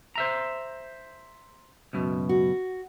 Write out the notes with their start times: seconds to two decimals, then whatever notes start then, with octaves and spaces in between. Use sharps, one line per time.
0.16 C5 E5 A#5
1.93 C#2 F#2 B2
2.29 F#4